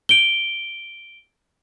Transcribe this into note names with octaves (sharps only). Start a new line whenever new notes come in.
D7 G7